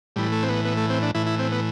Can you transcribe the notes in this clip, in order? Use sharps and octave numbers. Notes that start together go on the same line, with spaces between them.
A2 E3 G3
A3
C4
B3
B3
A3
C4
D4
A2 E3 E4
E4
C4
B3